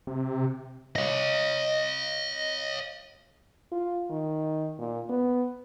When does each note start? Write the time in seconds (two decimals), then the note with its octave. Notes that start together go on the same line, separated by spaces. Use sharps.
0.07 C3
0.96 C#5 D#5
3.72 F4
4.10 D#3
4.79 A#2
5.10 B3